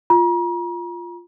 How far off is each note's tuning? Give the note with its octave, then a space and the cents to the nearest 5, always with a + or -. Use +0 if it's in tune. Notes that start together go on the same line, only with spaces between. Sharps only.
F4 +0 A#5 +40